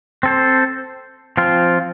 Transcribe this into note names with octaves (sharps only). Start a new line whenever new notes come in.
C4 A4 C5
F3 C4 F4